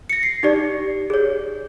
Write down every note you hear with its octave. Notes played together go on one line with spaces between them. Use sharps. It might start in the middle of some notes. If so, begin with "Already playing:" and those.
A#6 C#7
C7
D#4 G4 D5
G#4 C#5